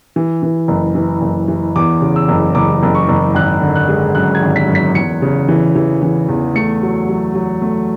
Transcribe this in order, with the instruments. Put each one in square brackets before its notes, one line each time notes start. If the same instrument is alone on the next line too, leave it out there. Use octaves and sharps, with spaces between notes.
[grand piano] E3
E3
F#1
E3
F#1
E3
E2 D6
C#3
E6
F#1
F#1 D6
F#1
C#6
F#1
G#1 F#6
D3
F#6
G#3
F#2 F#6
G#6
G#1
B6
F#2
B6
E2 C#7
C#3
E3
E3
E3
E2
A3 C#7
F#3
F#3
F#3
A3